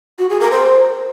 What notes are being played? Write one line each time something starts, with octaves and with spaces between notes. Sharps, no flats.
F#4
G#4
A#4
C5